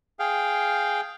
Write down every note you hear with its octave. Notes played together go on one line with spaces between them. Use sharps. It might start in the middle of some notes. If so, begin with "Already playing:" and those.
G#4 F5 G5